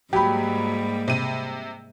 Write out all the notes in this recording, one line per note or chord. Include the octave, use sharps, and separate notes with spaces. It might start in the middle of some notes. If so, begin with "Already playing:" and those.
G#2 F#3 G3 A#3 G4 B5
C3 D#7